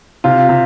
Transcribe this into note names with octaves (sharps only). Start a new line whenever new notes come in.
C3 F4
C3